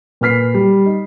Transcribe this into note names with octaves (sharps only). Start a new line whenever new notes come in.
A#2 B4 F6 B6 C7
G3
D#4